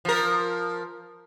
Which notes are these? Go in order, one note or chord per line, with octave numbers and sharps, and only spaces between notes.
F3 A#4